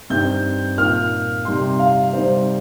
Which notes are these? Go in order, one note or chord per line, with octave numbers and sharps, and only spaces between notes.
G2 G3 C4 D#4 G6
A#2 A#3 D#4 F6
C3 G3 D#4 C6
F5
C3 G3 D#4 C5